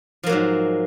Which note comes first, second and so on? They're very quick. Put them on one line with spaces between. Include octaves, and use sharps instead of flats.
F3 A#3 F#3 G#2